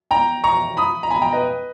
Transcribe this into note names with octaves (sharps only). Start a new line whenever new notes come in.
G5 A#5
A#5 C#6
B5 D#6
A#5
G#5 B5
G5 A#5
B4 D#5